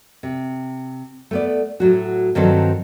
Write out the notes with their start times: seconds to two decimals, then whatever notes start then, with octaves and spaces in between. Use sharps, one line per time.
0.23 C3
1.31 A3 B3 D5
1.80 A2 F#3 F#4
2.35 G2 D#3 F3 F#3 C4 A4